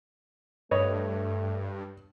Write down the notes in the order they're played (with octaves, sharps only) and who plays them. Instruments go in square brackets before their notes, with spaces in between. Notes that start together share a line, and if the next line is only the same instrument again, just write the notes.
[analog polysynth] G2 [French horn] A3 [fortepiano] B4 C#5 D#5